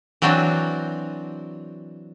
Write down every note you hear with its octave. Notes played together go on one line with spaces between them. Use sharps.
E3 F#3 C4 D4 F#4